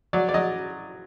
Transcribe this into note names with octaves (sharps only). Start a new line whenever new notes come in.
F#3 D5
D5
F#3 D#5